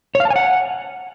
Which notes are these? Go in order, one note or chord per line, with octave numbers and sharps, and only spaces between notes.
C#5
F5
A5
G#5
F#5